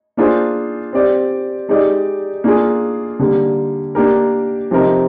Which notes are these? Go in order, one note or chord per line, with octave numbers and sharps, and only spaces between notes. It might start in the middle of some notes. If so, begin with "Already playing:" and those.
A#3 D4 F4 G#4 C5
C4 G4 D5
G#3 D#4 G4 D5
A#3 D4 F4 G#4
D3 G3 A#3
A#3 D4 G4 A#4
C3 F3 C4 D#4 A#4